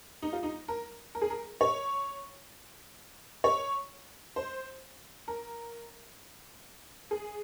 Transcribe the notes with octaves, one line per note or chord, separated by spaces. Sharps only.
D#4
F4
D#4
A#4
A#4
G#4
A#4
C#5
C#5
C5
A#4
G#4